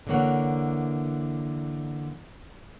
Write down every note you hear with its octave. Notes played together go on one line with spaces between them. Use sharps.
D3 E3 A#3 C#5 F#5